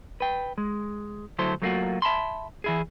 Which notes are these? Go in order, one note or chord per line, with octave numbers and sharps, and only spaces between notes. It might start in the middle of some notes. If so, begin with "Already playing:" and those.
B4 G5
G#3
D2 F#3 E4 A4 C5
F#3 A3 A#3 D#4 F4 F#4
E5 A5 B5 C6
E3 E4 G#4